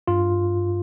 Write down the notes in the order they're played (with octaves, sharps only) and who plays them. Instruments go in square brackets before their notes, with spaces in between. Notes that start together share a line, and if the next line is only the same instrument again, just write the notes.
[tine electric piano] G2 F4